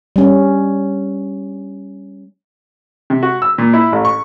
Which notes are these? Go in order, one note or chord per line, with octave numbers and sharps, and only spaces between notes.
G3 C#4
C3
F#4
E6
A#2
E4
A1
C#6